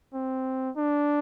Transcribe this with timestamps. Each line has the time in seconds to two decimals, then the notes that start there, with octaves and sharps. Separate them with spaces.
0.14 C4
0.76 D4